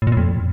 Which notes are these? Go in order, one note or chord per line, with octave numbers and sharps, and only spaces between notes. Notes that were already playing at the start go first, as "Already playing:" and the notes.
A2
A#2
A2
F2